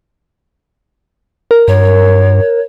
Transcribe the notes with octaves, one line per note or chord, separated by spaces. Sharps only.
A#4
G2 C#5